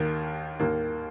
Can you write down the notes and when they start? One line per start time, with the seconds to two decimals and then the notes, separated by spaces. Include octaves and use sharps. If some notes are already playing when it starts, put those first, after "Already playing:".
Already playing: D#2 D#3 A#3
0.59 D#2 D#3 A#3